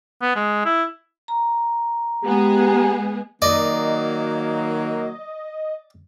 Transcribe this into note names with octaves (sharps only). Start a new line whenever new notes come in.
B3
G#3
E4
A#5
G#3 B3 G4 G#4
D#3 F#3 A#3 D5 D#5